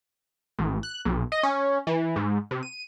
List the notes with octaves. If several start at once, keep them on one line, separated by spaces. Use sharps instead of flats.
A1
F#6
B1
D#5
C#4
E3
G#2
C3
D#7